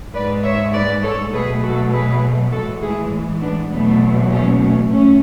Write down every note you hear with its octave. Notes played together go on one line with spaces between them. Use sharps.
G#2 G#3 B4 D5
C#5 E5
B4 D5
A4 C#5
B2 F#3 A3 G#4 B4
F#4 A4
G#4 B4
A2 E3 G#3 F#4 A4
E4 G#4
B3 D4
E2 B2 F#3 A3 B3
A3 C#4
A3 C#4
A2 A3 C#4